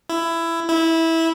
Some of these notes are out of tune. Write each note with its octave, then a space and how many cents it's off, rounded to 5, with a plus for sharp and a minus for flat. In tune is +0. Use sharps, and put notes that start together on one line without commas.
E4 +15
E4 -15